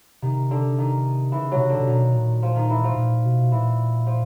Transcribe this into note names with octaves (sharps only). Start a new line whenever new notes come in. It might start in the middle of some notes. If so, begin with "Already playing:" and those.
C3 D#3
D3
D#3
C#3 E3
B2 F#3
C3
D3
C3
B2 D#3
A#2
F3
D#3
E3
F3
A#2
B2
A#2 E3
F3